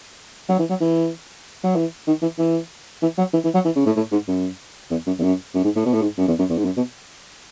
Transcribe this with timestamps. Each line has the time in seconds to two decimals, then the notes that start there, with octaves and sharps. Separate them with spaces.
0.49 F#3
0.59 E3
0.69 F#3
0.80 E3
1.64 F#3
1.76 E3
2.07 D#3
2.22 E3
2.38 E3
3.02 E3
3.18 F#3
3.33 E3
3.44 E3
3.54 F#3
3.65 E3
3.76 C#3
3.86 A2
3.96 A2
4.12 G#2
4.28 F#2
4.91 E2
5.07 F#2
5.19 E2
5.23 F#2
5.55 F#2
5.64 G#2
5.76 A2
5.86 B2
5.93 A2
6.02 G#2
6.18 F#2
6.28 E2
6.39 F#2
6.50 E2
6.58 G#2
6.65 F#2
6.76 B2